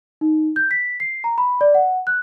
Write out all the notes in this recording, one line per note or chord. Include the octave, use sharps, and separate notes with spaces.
D#4
G6
B6
C7
A#5
B5
D5
F#5
F#6